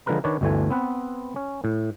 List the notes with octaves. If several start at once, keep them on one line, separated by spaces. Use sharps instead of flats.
D3 F3 G#3 A#4 B4 A#5
D#3 D4 B4 C#5 D5
G1 D2 D3 E3 A3 G#5
B3 C4 B4 F#5
C#4
A2